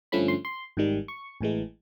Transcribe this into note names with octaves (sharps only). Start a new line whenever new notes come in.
G2 D3 F3 A3 C#4 B5
C6
C6
G#1 G#2 D#3 G3
C#6
A1 A2 E3 G#3